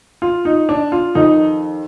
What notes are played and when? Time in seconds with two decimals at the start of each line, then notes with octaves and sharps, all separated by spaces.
0.22 F4
0.45 D#4
0.69 D4
0.92 F4
1.15 F2 D#3 D#4